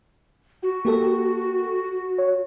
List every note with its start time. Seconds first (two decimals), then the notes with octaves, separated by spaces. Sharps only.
0.63 F#4
0.85 A#3 G4 A4
2.18 C#5